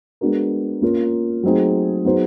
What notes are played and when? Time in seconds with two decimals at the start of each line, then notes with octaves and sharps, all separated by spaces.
0.21 G#3 B3 D4 F#4 A#4
0.82 A#3 C#4 F4 A#4
1.43 F#3 A3 C4 D#4 G#4
2.05 F#3 B3 D#4 G#4 C5